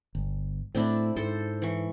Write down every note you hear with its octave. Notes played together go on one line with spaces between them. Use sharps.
G1
A2 C4 D4 E4
G#2 A4 C5
E3 C#6